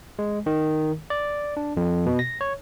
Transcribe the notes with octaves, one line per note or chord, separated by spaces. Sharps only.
G#3
D#3
D5
D4
F2
B2
A#6
C#5